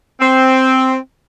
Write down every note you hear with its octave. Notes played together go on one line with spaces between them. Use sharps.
C4